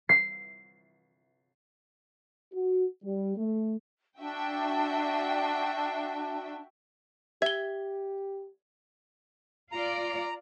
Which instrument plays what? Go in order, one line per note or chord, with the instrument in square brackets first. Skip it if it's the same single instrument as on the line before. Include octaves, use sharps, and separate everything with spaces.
[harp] C7
[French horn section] F#4
G3
A3
[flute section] D4 [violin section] F#4 E5 G5
[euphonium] G4 [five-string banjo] E5 [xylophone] G#6 G7
[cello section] F4 D5 [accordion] A#5